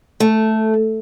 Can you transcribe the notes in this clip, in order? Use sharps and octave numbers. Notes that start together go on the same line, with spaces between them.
A3